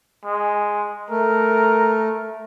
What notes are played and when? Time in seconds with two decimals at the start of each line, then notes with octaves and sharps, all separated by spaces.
0.25 G#3
1.10 A3 A#4